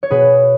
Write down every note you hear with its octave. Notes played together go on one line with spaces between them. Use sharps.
C#5
B2 G#4 B4